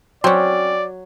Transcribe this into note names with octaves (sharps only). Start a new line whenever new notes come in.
F#3 C4 C#4 D5